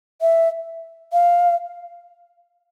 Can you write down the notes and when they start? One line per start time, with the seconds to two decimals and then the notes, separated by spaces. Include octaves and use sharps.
0.21 E5
1.13 F5